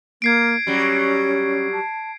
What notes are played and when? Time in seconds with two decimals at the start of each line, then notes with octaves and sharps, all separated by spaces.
0.22 A#3 G#6 C7 D7
0.67 F#3 G3 C#4
1.73 A5